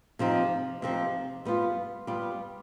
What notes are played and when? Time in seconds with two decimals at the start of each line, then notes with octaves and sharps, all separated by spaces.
0.19 C3 F3 C4 D#4
0.82 C3 F3 C4 D#4
1.45 G3 B3 F4
2.07 G3 B3 F4